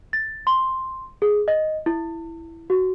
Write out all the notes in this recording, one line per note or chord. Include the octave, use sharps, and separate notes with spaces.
A6
C6
G#4
D#5
E4
F#4